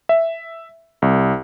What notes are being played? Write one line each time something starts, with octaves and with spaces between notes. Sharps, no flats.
E5
C2